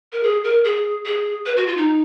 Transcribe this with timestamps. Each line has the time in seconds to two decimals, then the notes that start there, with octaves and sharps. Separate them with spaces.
0.12 A#4
0.23 G#4
0.44 A#4
0.64 G#4
1.05 G#4
1.46 B4
1.57 F#4
1.67 F4
1.77 D#4